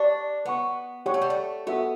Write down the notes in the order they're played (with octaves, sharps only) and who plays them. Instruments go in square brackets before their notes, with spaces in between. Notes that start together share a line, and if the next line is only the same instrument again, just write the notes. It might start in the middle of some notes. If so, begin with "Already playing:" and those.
Already playing: [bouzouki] D4 [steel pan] G4 D5 A5 C#6
[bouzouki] B3 [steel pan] B4 F#5 C#6
[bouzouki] B3 [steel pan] G4 C#5 F#5 C#6
[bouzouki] A3
G3
A3
[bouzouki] B3 [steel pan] F#4 A4 E5